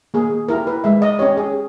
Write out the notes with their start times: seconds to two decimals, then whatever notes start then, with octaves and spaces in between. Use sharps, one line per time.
0.14 A#3 G#4
0.49 E4 G4 A#4
0.67 B4
0.84 G#3 E5
1.02 D#5
1.19 C#4 G4 C#5
1.37 G#4